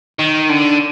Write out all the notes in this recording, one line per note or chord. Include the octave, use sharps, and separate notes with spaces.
D#3
D3